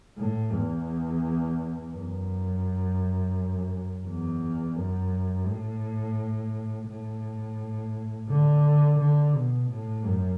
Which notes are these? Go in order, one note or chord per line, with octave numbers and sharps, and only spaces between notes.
A2
E2
F#2
E2
F#2
A2
A2
D3
D3
B2
A2
F#2